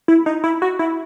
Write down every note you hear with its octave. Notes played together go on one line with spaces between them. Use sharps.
E4
D#4
E4
F#4
E4